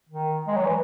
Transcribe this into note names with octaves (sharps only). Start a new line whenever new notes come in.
D#3
G#3
F#3
E3